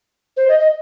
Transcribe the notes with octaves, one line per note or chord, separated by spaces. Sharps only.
C5
D#5
D#5